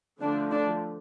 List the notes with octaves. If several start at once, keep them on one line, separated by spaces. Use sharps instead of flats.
D3 F3 A3 D4
D4